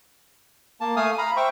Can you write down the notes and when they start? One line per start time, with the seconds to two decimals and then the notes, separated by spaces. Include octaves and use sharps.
0.81 A#3 A5
0.96 A3 F5 G#5 D#6
1.18 F5 A#5 B5
1.37 C5 E5 G5 C#6